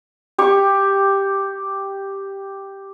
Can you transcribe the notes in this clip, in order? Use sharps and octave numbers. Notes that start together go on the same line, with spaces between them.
G4 C#6